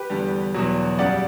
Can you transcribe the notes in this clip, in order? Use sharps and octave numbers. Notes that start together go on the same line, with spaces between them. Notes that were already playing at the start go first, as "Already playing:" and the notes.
Already playing: G4 B4
E2 D3 G3
E2 B2 F#3
F#2 C#3 G3 D5 F#5